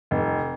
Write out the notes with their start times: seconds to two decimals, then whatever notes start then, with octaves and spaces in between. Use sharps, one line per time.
0.11 F1